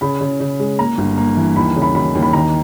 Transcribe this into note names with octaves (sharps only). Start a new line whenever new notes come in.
C#3 B5
C#3
C#3
G#3
A#3 A#5
G1
A#3
E3
D#2 B5
C#3
B5
D#2 B5
D#2
B5
D#3 A#5